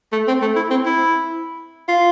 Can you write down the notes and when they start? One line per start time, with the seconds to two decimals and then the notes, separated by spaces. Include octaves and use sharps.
0.13 A3
0.28 C4
0.42 A3
0.56 E4
0.71 C4
0.86 E4
1.88 F4